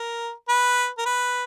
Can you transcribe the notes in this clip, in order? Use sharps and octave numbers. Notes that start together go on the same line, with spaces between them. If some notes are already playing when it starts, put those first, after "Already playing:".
Already playing: A#4
B4
A#4
B4